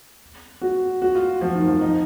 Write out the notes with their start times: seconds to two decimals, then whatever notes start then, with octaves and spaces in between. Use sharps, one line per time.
0.61 F#4
1.02 F#4
1.15 F4
1.41 F3
1.55 D#3
1.68 F3
1.81 D#4